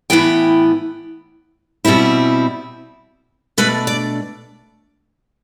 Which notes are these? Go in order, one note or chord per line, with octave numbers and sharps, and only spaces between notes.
A2 E3 B3 E4 G5
B2 G3 C4 E4
B2 A3 D4 B4
D5